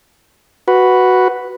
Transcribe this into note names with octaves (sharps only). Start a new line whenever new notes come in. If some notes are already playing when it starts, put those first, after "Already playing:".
F#4 B4